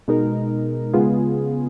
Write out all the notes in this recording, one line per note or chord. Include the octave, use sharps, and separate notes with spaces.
B2 G#3 D#4 A#4
C#3 G#3 B3 F4 G#4